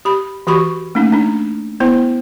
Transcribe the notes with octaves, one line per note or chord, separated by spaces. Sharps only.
G4 B5
E3 F#4 G4 B5 C#6
A3 A#3 C#4 D#4
D4 D#4
B3 E4 C5